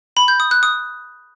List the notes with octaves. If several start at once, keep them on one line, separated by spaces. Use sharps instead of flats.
B5
G6
D#6
F#6
D#6